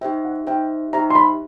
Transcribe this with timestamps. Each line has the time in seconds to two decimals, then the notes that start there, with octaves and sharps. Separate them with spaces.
0.01 D#4 G4 C5 E5 G5
0.25 F#5
0.47 D#4 G4 C5 E5 G5
0.93 D#4 G4 C5 E5 A#5
1.10 C6
1.15 B5